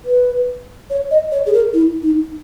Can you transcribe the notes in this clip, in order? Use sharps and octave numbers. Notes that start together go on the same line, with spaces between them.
B4
C#5
D#5
C#5
G#4
A#4
E4
D#4